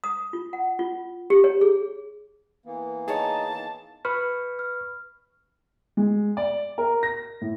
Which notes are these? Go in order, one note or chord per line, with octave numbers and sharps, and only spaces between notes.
D#6
F4
F#5
F4
G4
C#5
G#4
E3 A#3 B3
D#4 G#4 C#5 A5
B4 B5 C#6 F6
F6
G#3
D5
A#4
A#6
A2